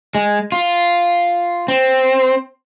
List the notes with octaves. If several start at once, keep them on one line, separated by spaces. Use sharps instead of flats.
G#3
F4
C4